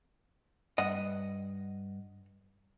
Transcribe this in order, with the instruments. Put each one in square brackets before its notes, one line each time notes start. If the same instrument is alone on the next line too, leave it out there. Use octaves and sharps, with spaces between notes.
[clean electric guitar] G2 [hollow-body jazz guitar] D#5 F#5